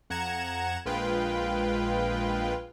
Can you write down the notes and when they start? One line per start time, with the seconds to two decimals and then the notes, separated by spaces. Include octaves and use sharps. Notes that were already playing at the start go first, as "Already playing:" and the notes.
0.10 F2 F#5 A#5 G#6 C#7 E7
0.85 A#1 G#3 F4 B4 G5